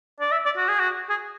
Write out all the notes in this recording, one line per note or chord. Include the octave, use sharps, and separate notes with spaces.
D5
E5
D5
F#4
G#4
F#4
G#4